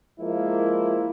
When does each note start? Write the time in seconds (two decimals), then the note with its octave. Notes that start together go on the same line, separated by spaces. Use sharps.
0.20 F3 G#3 A#3 E4